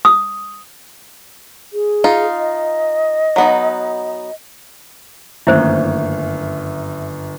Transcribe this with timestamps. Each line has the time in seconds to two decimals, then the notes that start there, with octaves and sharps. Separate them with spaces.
0.05 D#6
1.73 G#4
2.04 D#4 F4
2.37 D#5
3.36 F#3 B3 D#4
5.47 G1 F#2 D#3 A3 A#3 E4 C5 E5